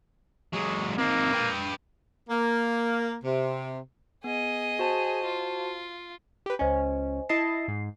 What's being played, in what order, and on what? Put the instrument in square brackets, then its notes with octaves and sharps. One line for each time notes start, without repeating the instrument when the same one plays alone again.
[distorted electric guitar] F#3 G#3
[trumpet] A#3 [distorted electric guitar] C4 D#4
[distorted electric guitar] B4 G5
[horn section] A#3
C3
[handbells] B3 [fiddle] G#4 D#5
[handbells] F#4 C5 A5
[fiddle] F4
[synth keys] G4 B4
[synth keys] C#2 C#4 [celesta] C5 D#5 G#5
[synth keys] E4 D#5 A5 [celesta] C7
[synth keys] G#2